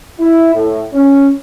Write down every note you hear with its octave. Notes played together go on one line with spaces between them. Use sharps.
E4
A2
C#4